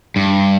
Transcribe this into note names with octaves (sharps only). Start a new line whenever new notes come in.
G2